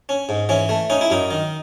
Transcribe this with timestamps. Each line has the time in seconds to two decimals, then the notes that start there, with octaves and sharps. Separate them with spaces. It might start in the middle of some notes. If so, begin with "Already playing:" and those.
0.09 C#4
0.29 G#2
0.49 E3 C#4
0.69 A3
0.90 C#4 D#4
1.01 E4
1.10 F#2 D#4
1.31 D#3